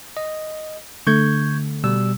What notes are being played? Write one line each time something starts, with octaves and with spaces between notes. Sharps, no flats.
D#5
D3 A3 C#6 G6 G#6
B2 G3 E6